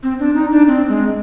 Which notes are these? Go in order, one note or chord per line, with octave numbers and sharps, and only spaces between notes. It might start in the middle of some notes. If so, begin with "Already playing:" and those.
C4
D4
D#4
D4
C4
G#3